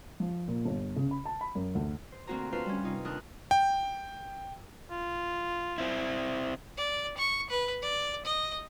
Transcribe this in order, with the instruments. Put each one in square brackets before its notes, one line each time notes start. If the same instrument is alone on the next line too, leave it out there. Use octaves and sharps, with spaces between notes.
[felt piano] F3
A#2
G1
C#3
B5
A5
B5
F#2
D2
[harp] C5
D2 A#3 C4 F#4 C5 A#5
D4 F4 F#4 B4 C5 F5
G3 C#4
C3 D#4 F4
D#2 D4 A#4 D#6 F#6
[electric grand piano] G5
[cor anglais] F4
[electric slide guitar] C4 E4
[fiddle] D5
C#6
B4
D5
D#5